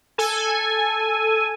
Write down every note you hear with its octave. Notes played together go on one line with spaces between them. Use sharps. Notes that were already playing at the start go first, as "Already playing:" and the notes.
A4 G#5